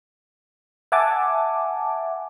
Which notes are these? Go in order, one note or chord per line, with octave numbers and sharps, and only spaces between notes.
E5 F#5 G#5 A5 D6